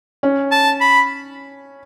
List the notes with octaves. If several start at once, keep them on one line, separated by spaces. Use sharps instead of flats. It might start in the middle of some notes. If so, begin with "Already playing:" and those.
C#4
A5
B5